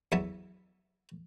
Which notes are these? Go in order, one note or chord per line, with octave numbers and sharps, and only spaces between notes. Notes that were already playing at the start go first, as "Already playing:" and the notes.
E2 F#3 E5 A5